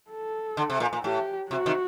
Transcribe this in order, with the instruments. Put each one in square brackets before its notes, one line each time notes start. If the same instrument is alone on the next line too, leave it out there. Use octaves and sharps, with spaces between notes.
[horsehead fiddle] A4
[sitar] D3
C3
A#2
A#2
[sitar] A2 [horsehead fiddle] G4
[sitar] C3 [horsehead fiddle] F#4
[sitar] C3 D#3